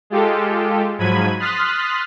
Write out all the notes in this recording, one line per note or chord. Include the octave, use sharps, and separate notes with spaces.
G#3 F4 G4 A4
G#2 F3 F#3 B5 G#6 D#7
C6 D#6 F6 F#6 A6 B6